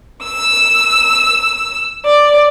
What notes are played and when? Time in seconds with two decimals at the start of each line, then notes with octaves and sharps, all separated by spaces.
0.24 E6
2.05 D5